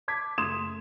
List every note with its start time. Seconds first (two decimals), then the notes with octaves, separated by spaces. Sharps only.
0.08 A5 D6 G#6 B6
0.38 F#1 A3 C6 D#6 G#6 E7